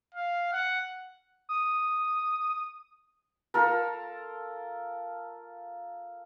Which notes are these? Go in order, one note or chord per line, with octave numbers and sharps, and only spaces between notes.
F5
F#5
D#6
F4 A4 A#4